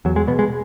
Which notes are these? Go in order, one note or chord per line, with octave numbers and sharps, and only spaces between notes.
E2 F#3
G#3
B2 B3
G#3